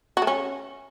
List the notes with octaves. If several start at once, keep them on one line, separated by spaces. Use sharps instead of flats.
F#4
A3
C#4